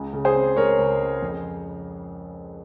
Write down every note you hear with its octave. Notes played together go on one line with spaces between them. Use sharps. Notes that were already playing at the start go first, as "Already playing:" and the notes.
Already playing: C#2 C#3
C#3
G#4 C5
C4
G#3 A#4 C#5
C#2
C#3
F2